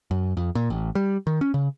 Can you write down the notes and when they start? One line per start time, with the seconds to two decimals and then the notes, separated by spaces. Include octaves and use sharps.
0.11 F#2
0.37 F2
0.55 A#2
0.70 A1
0.95 G3
1.27 D#3
1.41 C#4
1.54 C#3